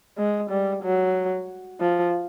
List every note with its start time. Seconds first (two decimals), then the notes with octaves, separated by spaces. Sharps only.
0.18 G#3
0.50 G3
0.83 F#3
1.80 F3